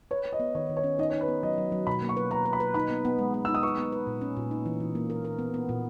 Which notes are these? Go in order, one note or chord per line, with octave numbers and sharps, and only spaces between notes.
B4 C#5
B4
D#5
B3
D#3 C#5
D#3
C#5
C#4
D#4 D#5
C#5
D#4
B4
B3
F#3 D#5
F#3
F#3
B2 B5
A#3
C#6
B4
B4 A#5
B4
B5
B4
D#4 B5
B3
B3
G#3
B3
D#4 E6
D#6
B4 C#6
B3
B4
A#2
C#4
A#2
D#4
E3
E3
A#3
A#4
A#4
B3
B3
A#2